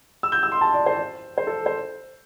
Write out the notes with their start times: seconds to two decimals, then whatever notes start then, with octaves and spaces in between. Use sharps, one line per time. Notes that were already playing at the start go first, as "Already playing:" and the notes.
0.23 E6
0.32 G6
0.43 E6
0.52 C6
0.61 A5
0.74 D5
0.86 C5
1.38 C5
1.47 A4
1.66 C5